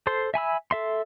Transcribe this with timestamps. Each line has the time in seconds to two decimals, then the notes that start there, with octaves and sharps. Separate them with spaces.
0.07 A4 C5 C6
0.34 E5 G#5 B5 E6
0.71 A4 E5 C6